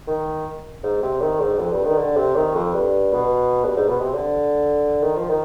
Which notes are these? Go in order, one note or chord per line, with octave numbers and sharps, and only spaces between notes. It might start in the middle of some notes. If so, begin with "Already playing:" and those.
D#3
G#2
C3
D#3
G#2
F2
G2
D#3
D3
C3
D#3
F2
G2
B2
G2
G#2
B2
C3
D3
D#3
F3
D#3